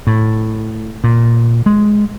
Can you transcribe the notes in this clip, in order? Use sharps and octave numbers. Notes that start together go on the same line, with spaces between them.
A2
A#2
G#3